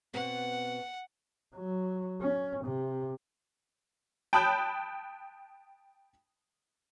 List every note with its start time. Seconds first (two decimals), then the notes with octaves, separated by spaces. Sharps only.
0.14 B2 B3 C4 F#5
1.56 F#3
2.22 C#4
2.65 C3
4.33 G5 A5 B5 D#6 F#6 G6